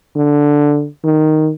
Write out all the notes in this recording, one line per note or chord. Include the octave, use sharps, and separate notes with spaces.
D3
D#3